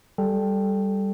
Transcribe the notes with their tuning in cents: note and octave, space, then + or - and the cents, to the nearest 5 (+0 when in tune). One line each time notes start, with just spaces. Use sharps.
G3 +0 A4 -10 G5 +0